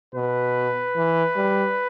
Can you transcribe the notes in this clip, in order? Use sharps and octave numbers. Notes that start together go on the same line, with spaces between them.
B2 B4
E3
G3